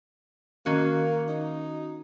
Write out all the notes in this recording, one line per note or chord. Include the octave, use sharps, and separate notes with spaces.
D#3 A#3 C#4 F#4
D#4